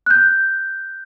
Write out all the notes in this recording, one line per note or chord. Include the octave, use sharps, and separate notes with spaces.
F#6 G6